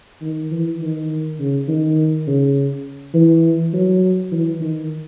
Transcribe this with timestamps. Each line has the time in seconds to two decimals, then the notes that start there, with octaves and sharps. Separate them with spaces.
0.22 D#3
0.51 E3
0.81 D#3
1.39 C#3
1.68 D#3
2.27 C#3
3.14 E3
3.73 F#3
4.32 E3
4.61 D#3